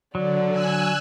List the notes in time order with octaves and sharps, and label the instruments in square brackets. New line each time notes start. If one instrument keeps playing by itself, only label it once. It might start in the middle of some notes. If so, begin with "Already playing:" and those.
[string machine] D3 [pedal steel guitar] F#3 [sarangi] D5
[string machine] G#5 E6 F#6